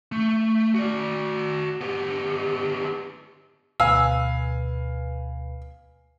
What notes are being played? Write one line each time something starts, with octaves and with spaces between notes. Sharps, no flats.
A3
F#4 D5
B3 G4
D2 B2 B4 F5 G#5 E6